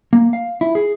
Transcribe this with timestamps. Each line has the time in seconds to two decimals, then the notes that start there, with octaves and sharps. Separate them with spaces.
0.13 A#3
0.33 F5
0.61 E4
0.75 G#4